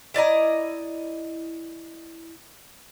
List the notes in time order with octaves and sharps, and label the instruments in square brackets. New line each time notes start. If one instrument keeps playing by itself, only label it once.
[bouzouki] E4 D5 D#5 A#5